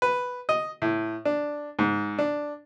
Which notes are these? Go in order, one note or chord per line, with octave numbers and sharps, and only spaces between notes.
B4
D#5
A2
D4
G#2
D4